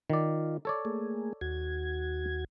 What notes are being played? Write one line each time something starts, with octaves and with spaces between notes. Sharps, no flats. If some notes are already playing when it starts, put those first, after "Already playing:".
D#3 F4 D5
A4 C#5 D5
A3 A#3 G#4
D#2 F#4 G#6